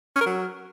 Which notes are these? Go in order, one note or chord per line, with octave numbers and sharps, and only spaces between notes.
C#4
A#4
F#3